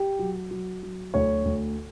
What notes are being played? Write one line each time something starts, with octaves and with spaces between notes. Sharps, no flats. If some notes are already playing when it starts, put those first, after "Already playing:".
Already playing: G4
F#3
F#3
F#3
D2 C#5
D2